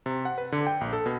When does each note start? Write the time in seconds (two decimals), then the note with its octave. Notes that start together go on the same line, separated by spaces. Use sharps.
0.06 C3
0.25 F#5
0.38 B4
0.52 D3
0.67 G5
0.81 A#1
0.93 A4
1.06 B2